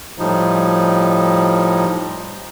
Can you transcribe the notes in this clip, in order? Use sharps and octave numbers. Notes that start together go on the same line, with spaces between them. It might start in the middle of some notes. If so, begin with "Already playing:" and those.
A2 F3 G3 D#4